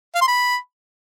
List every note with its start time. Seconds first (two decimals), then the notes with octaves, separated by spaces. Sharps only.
0.15 F5
0.21 C6
0.28 B5